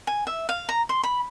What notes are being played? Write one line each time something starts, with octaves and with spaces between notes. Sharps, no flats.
G#5
E5
F5
A#5
C6
B5